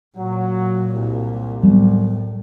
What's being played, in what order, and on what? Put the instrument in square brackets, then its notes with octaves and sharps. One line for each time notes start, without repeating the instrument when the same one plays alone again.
[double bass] A#2 [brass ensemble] F#3
[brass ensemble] C2
[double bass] A2 [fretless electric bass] F#3 G3 B3